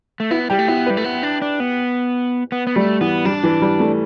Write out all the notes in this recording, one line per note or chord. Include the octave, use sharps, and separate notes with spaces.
A3
B3 E4
G3 G4
A3
B3 E4
G3 B4
A3
B3
D4
D4
B3
B3
B3
G3 A3
E3 B3
G3 D4
E3
G3
A3